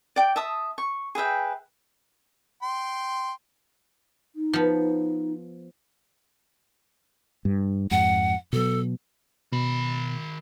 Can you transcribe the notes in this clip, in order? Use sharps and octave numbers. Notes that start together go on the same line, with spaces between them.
D5 G5
E5 A5 D#6
C#6
G#4 B4 E5 G5
G5 C6
D#4
F3 B3
G2
F2 G#2 F#5
B2 F#3 A4
B2 D#3 B5